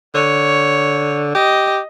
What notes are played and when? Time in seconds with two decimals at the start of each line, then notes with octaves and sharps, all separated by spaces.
0.14 D3 C#5
1.35 G4 D#5